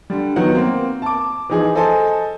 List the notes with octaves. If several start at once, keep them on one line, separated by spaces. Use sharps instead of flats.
D3 G3
D#3 F#3 B3 F#5
A#3 C4
A5 D6
E3 F3 D#4 G#4
A4 C5 D#5 G#5 A5